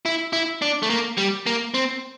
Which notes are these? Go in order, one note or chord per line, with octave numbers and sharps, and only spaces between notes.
E4
E4
D4
A3
A#3
G3
A#3
C4